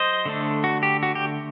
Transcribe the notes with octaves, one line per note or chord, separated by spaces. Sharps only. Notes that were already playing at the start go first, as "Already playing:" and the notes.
Already playing: F#3 C5 D#5
D3 A3 D4
F#4
G4
F#4
G4